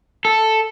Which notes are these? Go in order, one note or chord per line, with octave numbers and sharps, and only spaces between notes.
A4